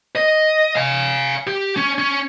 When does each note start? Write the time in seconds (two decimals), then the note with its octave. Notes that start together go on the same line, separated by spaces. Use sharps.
0.16 D#5
0.76 F5 G#5
1.47 G4
1.76 C#4
1.98 C#4